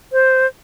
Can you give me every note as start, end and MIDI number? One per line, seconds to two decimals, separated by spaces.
0.12 0.47 72